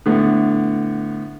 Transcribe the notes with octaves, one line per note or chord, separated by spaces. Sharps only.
A2 D3 B3